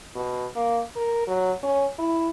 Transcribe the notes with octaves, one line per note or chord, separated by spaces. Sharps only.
B2
A#3
A#4
F#3
C#4
E4